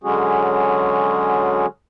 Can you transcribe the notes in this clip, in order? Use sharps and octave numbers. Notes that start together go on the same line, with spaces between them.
D3 F#3 G#3 C#4 F#4 G#4